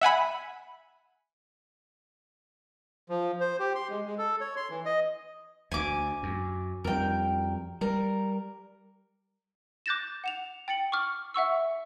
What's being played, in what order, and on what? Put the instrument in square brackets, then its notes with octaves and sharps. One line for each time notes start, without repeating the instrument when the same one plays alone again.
[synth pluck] E5 F#5 G#5 B5
[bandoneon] F3
C5
G4
C6
G#3
G#3
A4
C#5
C6
E3
D#5
[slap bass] D2 [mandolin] G#5 D6
[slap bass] F#2
[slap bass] F2 G3 [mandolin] A#4 G5
[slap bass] G3 [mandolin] A#4
[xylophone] D6 F#6 G6 A6 A#6 E7
F#5 E7 F7
G5 A6 C#7 F#7
C#6 D6 F6
E5 F#5 C#6 E6